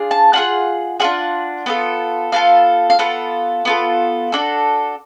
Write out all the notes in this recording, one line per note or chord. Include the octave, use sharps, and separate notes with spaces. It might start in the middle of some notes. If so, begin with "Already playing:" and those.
Already playing: D4 F4 G#4
A5
D4 F4 G#4 F#5
D4 F4 G#4 F#5
B3 F4 A4
B3 F4 A4 F5
F5
B3 F4 A4 F#5
B3 F4 A4
D4 F#4 A4